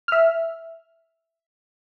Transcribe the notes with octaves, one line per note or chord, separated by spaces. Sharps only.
E5 F6